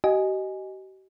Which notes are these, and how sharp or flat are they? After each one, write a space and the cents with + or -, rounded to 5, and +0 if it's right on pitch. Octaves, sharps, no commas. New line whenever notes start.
G4 -45 D#5 +0 G#5 +0